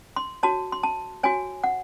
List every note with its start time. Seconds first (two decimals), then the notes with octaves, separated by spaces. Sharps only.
0.16 C6
0.43 F#4 C#5 A5
0.72 C6
0.83 A5
1.23 F#4 C#5 G#5
1.64 F#5